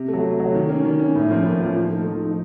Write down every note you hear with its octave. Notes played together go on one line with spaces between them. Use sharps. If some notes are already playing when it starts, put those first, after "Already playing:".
Already playing: C3
A3
F#3
C3
F#3 A3
D#3
A#3 C#4
D#3
A#3 C#4
A2
F3 A#3 C#4 F4
A2
F3 A#3 C#4 F4
F3
A3 D#4
F3
A3 D#4